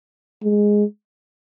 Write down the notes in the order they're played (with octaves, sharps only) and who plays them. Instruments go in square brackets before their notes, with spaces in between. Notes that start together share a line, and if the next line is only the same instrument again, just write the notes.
[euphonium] G#3